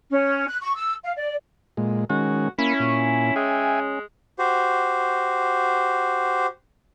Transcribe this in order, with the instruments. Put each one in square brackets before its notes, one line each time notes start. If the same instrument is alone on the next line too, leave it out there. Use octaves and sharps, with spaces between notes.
[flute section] C#4
F#6
C#6
E6
F5
D5
[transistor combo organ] A#2 G#3
[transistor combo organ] D#3 G#3 C#4 [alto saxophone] F#4
[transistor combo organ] A#3 B5 [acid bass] C#4 [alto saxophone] E4
[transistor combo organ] A#2
[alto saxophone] G#3 [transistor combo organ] E5 G5 G#5
[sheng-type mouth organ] F#4 G4 C5